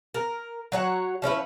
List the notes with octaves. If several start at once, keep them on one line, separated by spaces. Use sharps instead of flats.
A#4
F#3 C#5 F#5
F3 C#4 E4 B4